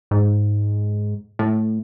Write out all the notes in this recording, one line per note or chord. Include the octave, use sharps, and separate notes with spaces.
G#2
A2